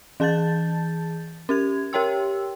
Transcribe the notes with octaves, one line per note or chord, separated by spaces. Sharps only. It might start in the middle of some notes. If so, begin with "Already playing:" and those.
E3 G#4 A5 G6 A6
C#4 G4 G#6
G4 A#4 C#5 G5 C6 E6